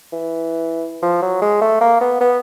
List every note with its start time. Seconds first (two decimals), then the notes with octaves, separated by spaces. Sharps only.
0.13 E3
1.02 F3
1.22 F#3
1.42 G#3
1.62 A3
1.81 A#3
2.01 B3
2.21 B3